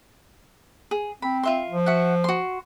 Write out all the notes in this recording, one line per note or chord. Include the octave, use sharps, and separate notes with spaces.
G#4
C4 B5
F4 E5 C6
F3
F#4 E5 F#5
F#4 C6